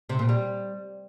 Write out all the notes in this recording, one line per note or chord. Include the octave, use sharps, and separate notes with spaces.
C3
A#2
G3